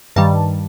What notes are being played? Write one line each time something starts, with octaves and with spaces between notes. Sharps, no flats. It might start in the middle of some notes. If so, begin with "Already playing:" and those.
G2 D#3 G3 A5